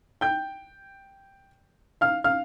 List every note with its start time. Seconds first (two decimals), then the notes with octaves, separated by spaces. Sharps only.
0.21 G5 G6
2.01 F5 F6
2.24 F5 F6